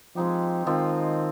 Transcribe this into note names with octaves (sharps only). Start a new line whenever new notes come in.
F3 G#3 C4 D#4 G4
D#3 F3 G#3 C4 F4